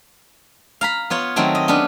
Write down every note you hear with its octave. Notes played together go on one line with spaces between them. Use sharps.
F5 A#5 B5
B3 F4 C#5 F#5
D#3 F#3 A3 C4 F#4
D#5
B3 C#4 D4 B4